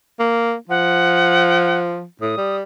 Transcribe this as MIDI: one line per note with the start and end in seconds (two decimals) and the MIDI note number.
0.19 0.54 58
0.70 2.04 53
0.70 1.80 78
2.22 2.33 45
2.22 2.56 87
2.38 2.63 55